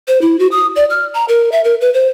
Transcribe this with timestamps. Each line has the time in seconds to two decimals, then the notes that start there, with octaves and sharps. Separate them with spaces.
0.08 C5
0.21 E4
0.39 F#4
0.51 D#6
0.76 D5
0.90 F6
1.14 A#5
1.28 A#4
1.52 E5
1.64 A#4
1.81 B4
1.94 C5